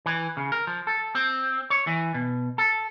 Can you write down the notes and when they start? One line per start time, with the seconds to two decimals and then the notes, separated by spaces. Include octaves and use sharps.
0.06 E3
0.37 C#3
0.52 A#4
0.67 F3
0.87 A4
1.15 C4
1.70 C#5
1.87 E3
2.14 B2
2.58 A4